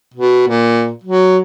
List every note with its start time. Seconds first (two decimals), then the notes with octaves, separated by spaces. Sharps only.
0.15 B2
0.48 A#2
1.04 F#3